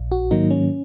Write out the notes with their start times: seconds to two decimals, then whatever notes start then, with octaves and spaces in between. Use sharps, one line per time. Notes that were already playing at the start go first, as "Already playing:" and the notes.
Already playing: A#1
0.12 F#4
0.31 G#2 D#3 F#3 A#3 D#4
0.51 C#4